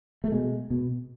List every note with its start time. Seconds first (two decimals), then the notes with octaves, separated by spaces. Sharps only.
0.24 A3
0.32 B2 G#3
0.70 B2